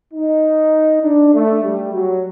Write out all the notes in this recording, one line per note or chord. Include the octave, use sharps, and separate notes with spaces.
D#4
D4
A3
G3
F#3